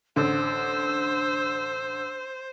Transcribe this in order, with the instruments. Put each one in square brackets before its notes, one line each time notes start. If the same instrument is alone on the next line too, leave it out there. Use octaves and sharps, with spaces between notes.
[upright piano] A1 D3 [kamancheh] C5 [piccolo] E6